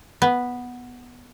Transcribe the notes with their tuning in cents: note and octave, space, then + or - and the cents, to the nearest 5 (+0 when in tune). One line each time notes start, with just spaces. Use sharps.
B3 -5